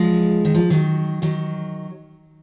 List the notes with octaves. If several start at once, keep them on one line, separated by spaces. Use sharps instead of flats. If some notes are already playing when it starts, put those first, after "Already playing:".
Already playing: F3 G#3
D#3
F3
D#3 F#3
D#3 F#3